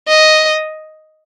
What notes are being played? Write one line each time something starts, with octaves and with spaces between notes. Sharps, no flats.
D#5